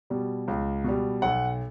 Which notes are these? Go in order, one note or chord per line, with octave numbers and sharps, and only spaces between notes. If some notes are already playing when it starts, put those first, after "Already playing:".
B2 G3
C#2
B2 G3
B1 F#5